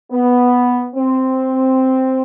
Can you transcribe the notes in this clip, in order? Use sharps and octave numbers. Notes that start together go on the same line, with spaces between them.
B3
C4